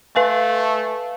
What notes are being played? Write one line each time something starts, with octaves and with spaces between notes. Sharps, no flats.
A3 B4 F5 G#5